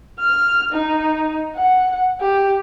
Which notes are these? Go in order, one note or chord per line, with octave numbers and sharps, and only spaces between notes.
F6
D#4
F#5
G4